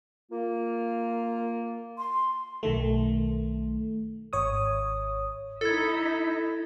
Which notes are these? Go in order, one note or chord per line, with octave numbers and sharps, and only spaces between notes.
A#3 F4
C6
B1 D#3 A3
G#1 C#5 D#6
D#4 E4 A4 E5 G#6 A6